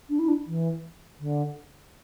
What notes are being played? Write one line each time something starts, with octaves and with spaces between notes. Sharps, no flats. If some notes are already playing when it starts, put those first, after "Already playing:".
D4
E4
D4
E3
D3